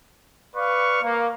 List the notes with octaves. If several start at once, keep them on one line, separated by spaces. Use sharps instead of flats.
B4 D5 F5 C#6
A#3